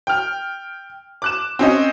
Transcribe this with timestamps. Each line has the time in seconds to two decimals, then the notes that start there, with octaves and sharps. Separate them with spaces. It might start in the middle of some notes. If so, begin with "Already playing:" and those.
0.07 G5 F6
1.22 D6 F#6 E7
1.59 C4 C#4 D#5